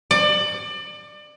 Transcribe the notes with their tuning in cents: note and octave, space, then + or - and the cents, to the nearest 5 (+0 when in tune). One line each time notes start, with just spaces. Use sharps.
D5 +30